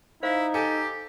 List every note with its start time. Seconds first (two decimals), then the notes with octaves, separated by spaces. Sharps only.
0.23 D#4 E4 C5 F5
0.54 G4 A4 G#5